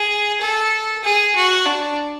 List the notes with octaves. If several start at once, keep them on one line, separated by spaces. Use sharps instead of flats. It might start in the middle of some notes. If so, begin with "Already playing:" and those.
Already playing: G#4
A4
G#4
F#4
D4